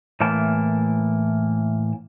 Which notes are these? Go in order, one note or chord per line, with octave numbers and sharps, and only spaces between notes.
A2 E3 A#3 A5